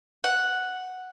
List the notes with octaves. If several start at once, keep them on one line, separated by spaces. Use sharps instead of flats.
F#5